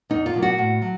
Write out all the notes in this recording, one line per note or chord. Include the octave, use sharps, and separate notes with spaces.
E2 D#4
F4
B2 F#3 A#3
F#4
A2
F#3